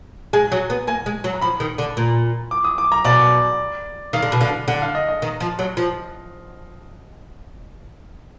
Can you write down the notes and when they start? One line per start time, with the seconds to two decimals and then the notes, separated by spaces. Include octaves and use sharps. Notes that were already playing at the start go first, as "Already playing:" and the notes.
0.33 G#3 G#5
0.52 F#3
0.70 B3
0.87 A#3 G#5
1.06 G#3
1.24 F#3
1.34 A#5
1.41 F3 B5
1.60 D#3
1.78 D3
1.97 A#2
2.51 D6
2.65 D#6
2.78 D6
2.92 A#5
3.05 B2 D5
4.13 D#3 F5
4.23 D3
4.32 B2
4.41 D3 F5
4.68 D3 F#5
4.82 F5
4.95 D#5
5.09 D#5
5.22 D#3
5.40 F3
5.59 F#3
5.77 F3